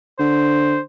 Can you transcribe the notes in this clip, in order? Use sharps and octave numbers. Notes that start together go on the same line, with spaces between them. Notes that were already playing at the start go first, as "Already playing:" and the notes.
D3 C5